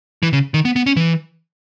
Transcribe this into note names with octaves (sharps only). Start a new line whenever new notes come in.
E3
C#3
D#3
B3
B3
C#4
E3